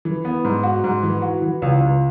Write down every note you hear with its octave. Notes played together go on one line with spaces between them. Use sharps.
E3
B3
G#2
F#4
G#2
E3
F#4
E3
C#2
C#2